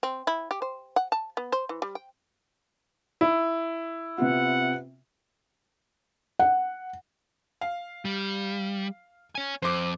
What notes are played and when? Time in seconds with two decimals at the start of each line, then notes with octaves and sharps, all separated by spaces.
0.03 C4
0.27 E4
0.51 G4
0.62 C5
0.96 F#5
1.12 A5
1.37 B3
1.52 C5
1.69 E3
1.82 G3
1.95 G5
3.21 E4
4.18 C3 B3 F4 F#5
6.39 F#5
7.61 F5
8.05 G3
9.35 C#5 G#5
9.62 F2 C5 D6